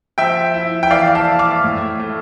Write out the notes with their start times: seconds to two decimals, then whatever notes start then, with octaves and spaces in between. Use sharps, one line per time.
0.18 F3 E5 G5
0.54 E4
0.83 G5
0.91 E3 D5 F5
1.15 F5 A5
1.27 E4
1.39 D6 F6
1.64 A2
1.99 A3